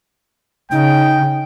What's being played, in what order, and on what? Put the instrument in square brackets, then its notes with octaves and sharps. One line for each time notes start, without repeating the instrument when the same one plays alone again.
[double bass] C#3 [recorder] D#4 [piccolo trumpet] G5